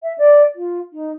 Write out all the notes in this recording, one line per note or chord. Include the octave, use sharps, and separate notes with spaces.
E5
D5
F4
D#4